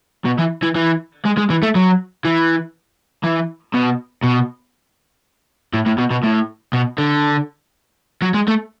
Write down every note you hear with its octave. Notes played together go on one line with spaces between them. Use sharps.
B2
E3
E3
E3
G#3
G#3
E3
A3
F#3
E3
E3
B2
B2
A2
A2
B2
B2
A2
B2
D3
F#3
G#3
A3